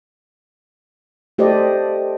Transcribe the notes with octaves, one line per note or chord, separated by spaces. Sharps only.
A3 G4 A4 C5 D5 D#5